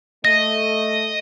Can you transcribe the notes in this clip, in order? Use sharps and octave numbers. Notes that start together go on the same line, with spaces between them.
A3 D#5 A#6